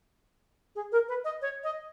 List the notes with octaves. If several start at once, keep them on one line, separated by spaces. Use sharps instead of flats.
G#4
A#4
B4
D#5
C#5
D#5